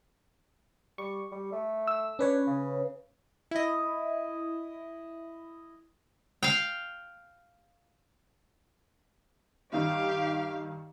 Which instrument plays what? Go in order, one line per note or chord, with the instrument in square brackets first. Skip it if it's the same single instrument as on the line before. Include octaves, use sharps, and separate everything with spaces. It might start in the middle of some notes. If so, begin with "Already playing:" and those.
[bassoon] G3 [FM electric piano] C#6
[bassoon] G3
A3
[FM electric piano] E6
[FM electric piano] C#4 B4 C#5 [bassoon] D4
[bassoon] C#3
[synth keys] E4 D#5
[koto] F5 G5
[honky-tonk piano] G2 D#3 [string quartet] G4 F5